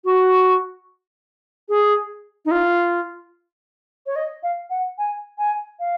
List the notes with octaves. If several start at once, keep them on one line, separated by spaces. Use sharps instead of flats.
F#4
G#4
D#4
F4
C#5
D#5
F5
F#5
G#5
G#5
F5